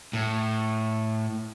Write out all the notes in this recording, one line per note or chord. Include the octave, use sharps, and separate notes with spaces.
A2